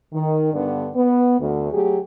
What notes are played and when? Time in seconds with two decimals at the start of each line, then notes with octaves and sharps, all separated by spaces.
0.13 D#3
0.53 G2 D3 B3 D4
0.96 B3
1.41 D2
1.72 F#3 A3 G4 G#4